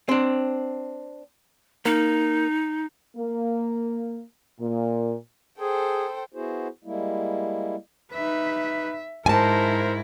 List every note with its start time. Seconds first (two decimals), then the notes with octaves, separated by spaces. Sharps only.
0.09 C4 D4
1.85 A#3 D#4
3.16 A#3
4.60 A#2
5.59 G#4 A4 C5 G5
6.34 B3 E4 F#4 G#4 C5
6.84 G3 G#3 A#3 E4
8.13 D#4 B4 E5
9.26 G#2 E4 A#4 C5 G#5 A5